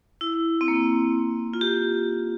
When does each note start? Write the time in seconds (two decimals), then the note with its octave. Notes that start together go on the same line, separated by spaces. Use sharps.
0.21 E4
0.61 C4
0.68 A#3
1.54 F4
1.61 G4